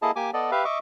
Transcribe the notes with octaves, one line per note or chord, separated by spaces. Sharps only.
A#3 E4 G#4 A4 D#5 A5
A#3 G4 G#5 D6
B3 A4 D5 D#5
G4 B4 E5 F5
D#5 E5 C#6 D6